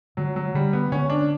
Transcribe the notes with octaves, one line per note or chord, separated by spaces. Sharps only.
D3 F#3
F#3
D3 G3
B3
D3 C#4
D4